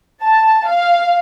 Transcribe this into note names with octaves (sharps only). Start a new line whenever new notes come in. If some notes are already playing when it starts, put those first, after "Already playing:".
A5
F5